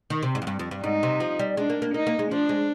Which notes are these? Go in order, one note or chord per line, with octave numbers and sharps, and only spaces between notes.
D#3
C3
G#2
F2
G2
F2
G2
G#2 D#4
C3
F3
G3
G#3 D4
A#3
A#3
A#3 D#4
A#3
G#3
F3 D4
G#3